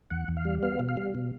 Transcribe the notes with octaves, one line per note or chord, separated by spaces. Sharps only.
E2 F#5
E2
F5
G3
B3 F5
B2
F5
G3
B2